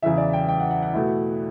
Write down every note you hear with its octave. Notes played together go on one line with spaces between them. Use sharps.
E2 C#3 E3 E5
D5
G5
G5
F#5
F#5
F#5
B2 A3 E4